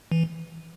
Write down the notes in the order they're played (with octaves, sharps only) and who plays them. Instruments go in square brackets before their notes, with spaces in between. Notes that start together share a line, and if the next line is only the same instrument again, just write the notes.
[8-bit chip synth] E3